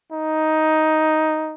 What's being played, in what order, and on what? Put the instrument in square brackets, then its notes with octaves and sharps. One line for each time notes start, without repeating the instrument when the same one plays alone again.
[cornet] D#4